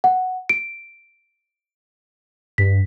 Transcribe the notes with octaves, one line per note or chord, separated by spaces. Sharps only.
F#5
D7
G2 B6